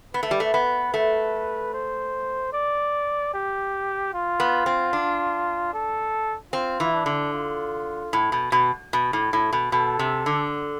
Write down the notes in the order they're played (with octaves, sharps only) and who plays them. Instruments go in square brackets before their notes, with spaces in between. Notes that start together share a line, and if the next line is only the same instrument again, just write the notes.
[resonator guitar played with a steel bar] B3 [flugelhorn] B4
[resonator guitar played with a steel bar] A3
G3
A3
B3
A3
[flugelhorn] C5
D5
G4
F4
[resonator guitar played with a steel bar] B3
C4
D4
[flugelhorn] A4
[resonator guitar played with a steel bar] C4 [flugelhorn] F4
[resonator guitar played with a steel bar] E3
[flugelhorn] D4
[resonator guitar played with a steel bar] D3
[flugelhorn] F4
[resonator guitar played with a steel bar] A2
B2
B2
B2
A2
A2
B2
[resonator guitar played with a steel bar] B2 [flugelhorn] A4
[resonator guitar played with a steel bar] C3
D3